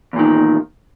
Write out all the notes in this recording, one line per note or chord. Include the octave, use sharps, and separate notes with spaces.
E2 A#2 D#3